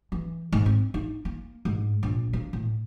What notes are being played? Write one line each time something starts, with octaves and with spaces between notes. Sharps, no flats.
E3
G#2
C4
D#4
A#3
G#2
A#1
A#3
A2